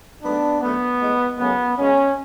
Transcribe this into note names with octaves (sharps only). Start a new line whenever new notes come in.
G#2 F#3 A3 B3 D4
F#2 D3 A3 B3
A2 G#3
F#2 C#3 F#3 A3 B3
F#2 C#3 G#3 C#4